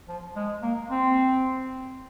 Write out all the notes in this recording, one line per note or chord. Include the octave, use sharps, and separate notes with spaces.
F3
G#3
A#3
C4